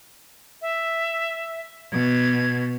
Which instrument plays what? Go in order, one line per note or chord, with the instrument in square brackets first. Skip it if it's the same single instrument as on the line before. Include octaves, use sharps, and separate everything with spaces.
[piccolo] E5
[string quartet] B2 [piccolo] G#6